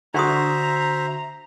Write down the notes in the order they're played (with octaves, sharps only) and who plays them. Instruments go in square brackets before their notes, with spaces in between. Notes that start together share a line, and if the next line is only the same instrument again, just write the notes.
[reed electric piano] D3 F#4 [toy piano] D4 C6 D#6 [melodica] C5 E5 [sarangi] A#5